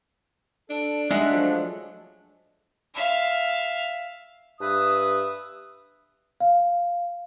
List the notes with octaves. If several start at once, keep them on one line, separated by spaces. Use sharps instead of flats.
D4 A4
G3 G#3 D4 D#4 E5 F#5
F3 F#3 A3 A4
E5 F5
G2 B4 E5 D#6
F5